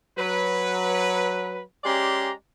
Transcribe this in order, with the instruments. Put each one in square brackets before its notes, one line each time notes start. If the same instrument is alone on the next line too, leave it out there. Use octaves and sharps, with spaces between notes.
[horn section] F#3 B4
G#3 C#4 G4 D5 A#5 C6